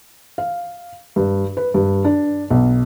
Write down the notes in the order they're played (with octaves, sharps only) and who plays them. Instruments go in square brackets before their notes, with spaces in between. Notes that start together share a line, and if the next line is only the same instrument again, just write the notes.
[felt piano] F5
G2
B4
G2
D4
B1